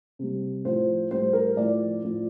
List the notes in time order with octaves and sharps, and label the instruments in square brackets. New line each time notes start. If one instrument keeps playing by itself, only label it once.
[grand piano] C3 G3
A2 F3 C5
A2 G3 C5
A#4
A2 F3 D5
A2 F3